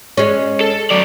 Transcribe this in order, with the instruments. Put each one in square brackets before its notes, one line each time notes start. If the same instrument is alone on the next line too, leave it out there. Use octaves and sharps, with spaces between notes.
[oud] G#3 C#4
[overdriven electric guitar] A4
F#3 D5